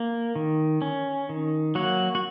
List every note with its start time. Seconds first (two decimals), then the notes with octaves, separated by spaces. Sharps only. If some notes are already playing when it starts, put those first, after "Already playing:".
Already playing: A#3
0.36 D#3
0.82 C#4
1.29 D#3
1.75 F#3 A#3 F#4
2.15 F#4